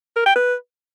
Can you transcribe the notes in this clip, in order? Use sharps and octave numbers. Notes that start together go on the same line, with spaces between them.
A#4
G5
B4